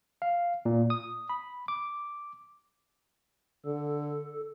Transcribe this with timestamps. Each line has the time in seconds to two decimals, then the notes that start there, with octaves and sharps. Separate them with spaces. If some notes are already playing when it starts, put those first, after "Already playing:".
0.22 F5
0.65 A#2
0.90 D#6
1.29 B5
1.68 D6
3.66 D3 A4